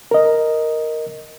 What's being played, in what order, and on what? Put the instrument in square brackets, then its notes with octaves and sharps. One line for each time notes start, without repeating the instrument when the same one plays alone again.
[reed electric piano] A#4 D#5